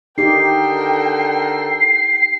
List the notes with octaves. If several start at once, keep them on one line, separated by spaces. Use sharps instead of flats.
D3 D#4 G4 A4 A#4 G5 C7